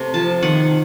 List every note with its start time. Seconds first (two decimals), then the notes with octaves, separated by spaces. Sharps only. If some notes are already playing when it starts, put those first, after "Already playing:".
Already playing: C3 A3
0.14 F3 A5
0.42 D#3 F#5